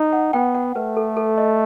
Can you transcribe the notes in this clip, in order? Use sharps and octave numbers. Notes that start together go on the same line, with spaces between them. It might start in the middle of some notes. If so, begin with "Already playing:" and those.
Already playing: D#4
F#5
B3 G5
F#5
A3 B4
A4
A4
D#5